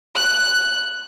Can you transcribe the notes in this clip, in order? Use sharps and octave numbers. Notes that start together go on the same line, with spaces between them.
F#6